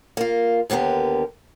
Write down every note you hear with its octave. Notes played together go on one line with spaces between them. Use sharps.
A#3 F4
D#2 D3 B3 G4 A#4